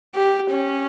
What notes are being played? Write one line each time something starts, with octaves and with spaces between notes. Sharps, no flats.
G4
C#4